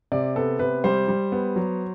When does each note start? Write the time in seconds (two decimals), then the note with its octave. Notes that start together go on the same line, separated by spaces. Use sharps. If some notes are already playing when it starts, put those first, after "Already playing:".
0.12 C3 D5
0.36 B3 A4
0.59 C3 B4
0.84 G3 C5
1.08 G3
1.32 B3
1.56 F#3